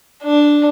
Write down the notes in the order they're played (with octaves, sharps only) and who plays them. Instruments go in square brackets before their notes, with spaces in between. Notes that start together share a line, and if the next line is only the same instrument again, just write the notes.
[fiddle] D4